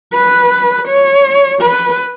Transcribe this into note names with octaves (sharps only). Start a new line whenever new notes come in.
B4
C#5
B4